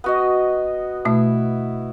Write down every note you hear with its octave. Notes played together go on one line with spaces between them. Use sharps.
B3 F#4 D#5
B2 A3 E4